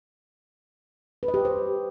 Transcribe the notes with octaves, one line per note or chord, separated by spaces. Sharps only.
B4
D#5
G4
D#5
C5